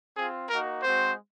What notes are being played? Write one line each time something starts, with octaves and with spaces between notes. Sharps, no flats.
C4 F4 G#4
A#3 D#4 F#4 A#4
G#3 C4 F#4 C5